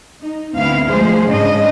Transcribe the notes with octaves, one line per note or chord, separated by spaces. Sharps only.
D#4
D2 D3 B3 C4 E4 F5
F3 G#3 A3 G#4 C5
G#2 C#3 D4 D#5